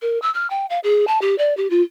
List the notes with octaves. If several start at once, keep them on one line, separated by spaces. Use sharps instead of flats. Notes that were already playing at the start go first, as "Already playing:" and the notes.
A#4
E6
F6
G5
F5
G#4
A5
G4
D5
G4
F4